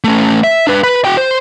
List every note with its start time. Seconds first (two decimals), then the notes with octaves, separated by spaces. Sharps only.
0.04 A3 C#4
0.44 E5
0.67 D4 B4
0.83 B4 B5
1.05 F#4 G5
1.17 C5